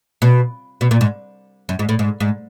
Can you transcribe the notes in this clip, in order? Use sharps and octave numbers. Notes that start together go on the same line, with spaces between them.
B2
B2
A#2
G#2
F#2
G#2
A2
G#2
G#2